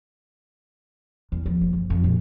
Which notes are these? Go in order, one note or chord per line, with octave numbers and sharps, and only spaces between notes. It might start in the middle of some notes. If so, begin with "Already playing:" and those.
E2
F3
F#1
E2
F2
A#1